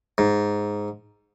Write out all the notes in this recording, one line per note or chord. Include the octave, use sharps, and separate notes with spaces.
G#2